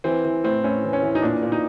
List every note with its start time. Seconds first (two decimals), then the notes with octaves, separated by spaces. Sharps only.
0.04 E3 C4
0.25 E3
0.44 A2 C4
0.64 A2 C#4
0.84 E3
0.93 C#4
1.03 E3
1.15 D#4
1.22 A#2 D4
1.43 A#2
1.52 D#4